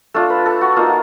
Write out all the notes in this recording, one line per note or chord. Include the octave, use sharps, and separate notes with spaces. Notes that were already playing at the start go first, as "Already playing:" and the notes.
A3 D4 F4 A4
B4
A4
F#4
A#3 D#4 F4